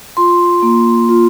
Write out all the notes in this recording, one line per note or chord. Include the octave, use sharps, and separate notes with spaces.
F4 C6
A#3
F4